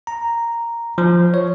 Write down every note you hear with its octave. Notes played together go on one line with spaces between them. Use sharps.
A#5
F3
C#5